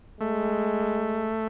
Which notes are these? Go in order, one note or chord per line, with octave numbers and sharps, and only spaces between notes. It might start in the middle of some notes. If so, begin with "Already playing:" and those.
G#3 A3